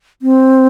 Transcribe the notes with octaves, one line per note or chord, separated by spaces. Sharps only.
C4